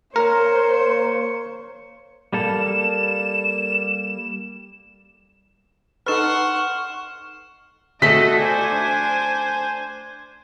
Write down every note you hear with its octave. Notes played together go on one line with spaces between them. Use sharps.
A#3 A#4 C5 C#5
G3 A#3 A4 E7
D#4 A4 B4 F#5 C6 C#6 F6 E7
A3 F#4 A4 D#5 E5 A5 B6
C5 D5 G#5
D4